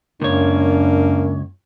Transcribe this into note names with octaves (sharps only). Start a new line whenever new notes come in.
C#2 F#2 A#3 D4 C#5